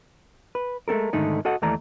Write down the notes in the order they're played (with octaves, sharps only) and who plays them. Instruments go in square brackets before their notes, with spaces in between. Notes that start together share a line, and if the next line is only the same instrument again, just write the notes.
[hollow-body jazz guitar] B4
G#3 A3 C4 A4 A#4
G#2 D3 D#3 A3 D#4
F#4 A4 D#5 F#5
D#2 E3 A3 D5 A#5